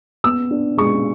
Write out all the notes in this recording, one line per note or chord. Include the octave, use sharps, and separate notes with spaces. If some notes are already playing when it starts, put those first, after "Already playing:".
B3 E6
D4
G#3 C#6